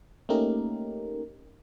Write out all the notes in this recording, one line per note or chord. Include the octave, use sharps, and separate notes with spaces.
A3 A#3 C#4 D#4 G4 A#4